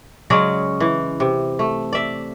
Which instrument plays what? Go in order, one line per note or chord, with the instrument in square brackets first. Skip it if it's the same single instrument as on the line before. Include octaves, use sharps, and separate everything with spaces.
[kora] C#3 F#3 G#3 D5
E3
C3
A3
D5 E5